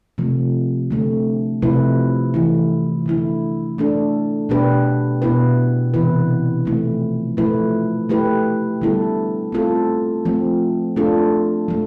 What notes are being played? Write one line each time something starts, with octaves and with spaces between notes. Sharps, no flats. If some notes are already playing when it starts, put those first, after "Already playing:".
C3 F3 A3
D3 A3 C4
C3 F3 A3 E4 B4
E3 A3 E4
D3 A3 E4
A3 D4 A4
B2 B3 D4 G4 B4
B2 B3 E4 B4
C3 E3 B3 E4 B4
F3 A3 C4 E4
F3 A3 E4 B4
A3 E4 G4 B4
D3 G3 B3 E4 A4
A3 C4 F4 A4
F3 A3 C4
A3 D4 F4 A4
F3 A3